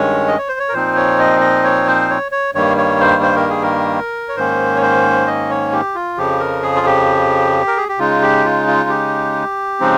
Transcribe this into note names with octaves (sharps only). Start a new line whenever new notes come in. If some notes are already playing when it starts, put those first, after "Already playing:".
Already playing: G2 D#3 G#3 C#4 C#5
D#5
C#5
C5
C#5
A#4
A#2 F3 C4 D#4 C5
C#5
D#5
D#5
C#5
C5
C#5
C#5
G2 D#3 G3 A#3 C#5
C#5
C5
C5
A#4
G#4
A#4
C#5
G#2 D#3 A#3 C#4 C5
C#5
C5
D#5
C#5
G4
F4
F2 C#3 F3 G4
A#4
G#4
F4
G4
A#4
G#4
G4
C#3 G#3 D#4 F4
G4
F4
F4
G4
C#3 F3 G#3 C4 D#4